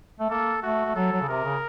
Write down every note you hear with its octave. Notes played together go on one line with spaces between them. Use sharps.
A3
A#3 A4
A3 F#4
A3
F#3 A4
F#3
C#3
C3 A#4
C#3